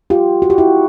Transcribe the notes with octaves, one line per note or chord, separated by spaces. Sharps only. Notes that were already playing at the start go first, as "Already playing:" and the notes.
F4 G4
F#4
G4
E4 F#4